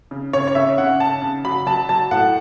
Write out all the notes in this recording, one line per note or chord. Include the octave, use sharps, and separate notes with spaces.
C#3
C#3 C#5
C#5
C#3 E5
C#3 F#5
C#3 A5
C#3
F#3 B5
F#3 A5
F#3 A5
A2 F#5